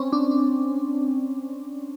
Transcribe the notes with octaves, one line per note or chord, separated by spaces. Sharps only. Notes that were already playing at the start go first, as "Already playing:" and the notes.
Already playing: C4 C#4
D4
D4